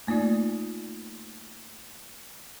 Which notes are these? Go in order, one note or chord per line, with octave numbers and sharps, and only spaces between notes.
A3 A#3 D#4 F4 D5